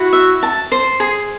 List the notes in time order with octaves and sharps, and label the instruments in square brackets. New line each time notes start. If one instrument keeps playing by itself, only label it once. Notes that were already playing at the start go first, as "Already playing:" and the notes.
Already playing: [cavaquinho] E4 [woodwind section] F#4
[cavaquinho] E5
A5
C5
G#4